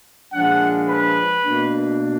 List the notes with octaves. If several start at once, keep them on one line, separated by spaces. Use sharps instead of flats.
A#2 F3 G#3 D4 F#5
B4
B2 A#3 D4